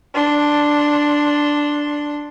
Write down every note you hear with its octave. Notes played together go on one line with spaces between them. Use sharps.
D4 C6